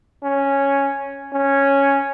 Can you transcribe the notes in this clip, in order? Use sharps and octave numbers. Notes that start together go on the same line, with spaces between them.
C#4
C#4